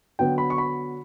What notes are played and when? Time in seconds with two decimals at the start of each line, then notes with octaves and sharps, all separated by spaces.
0.19 D3 F#3 B3 G5
0.38 B5
0.50 C#6
0.58 B5